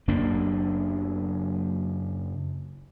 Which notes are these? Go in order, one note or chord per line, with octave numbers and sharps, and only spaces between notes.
F#1 F#2 A#3 D4